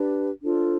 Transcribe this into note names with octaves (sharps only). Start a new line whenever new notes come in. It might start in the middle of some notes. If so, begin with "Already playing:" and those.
Already playing: D4 G4 B4
D4 F4 A4 C5